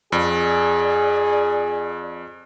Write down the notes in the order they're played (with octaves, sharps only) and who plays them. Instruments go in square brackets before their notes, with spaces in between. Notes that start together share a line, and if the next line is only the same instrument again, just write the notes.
[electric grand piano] F2 [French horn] G#4 [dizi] D5